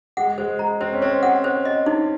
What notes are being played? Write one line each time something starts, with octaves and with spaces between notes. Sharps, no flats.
G#3 F#5
G#3 C5
G#3 A#5
C4 C5
C#4
C4 C5
F#5
C5
D#5
D#4